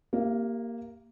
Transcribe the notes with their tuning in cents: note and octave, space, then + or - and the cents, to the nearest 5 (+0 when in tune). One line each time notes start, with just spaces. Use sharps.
A#3 +0 G4 +0 E5 +45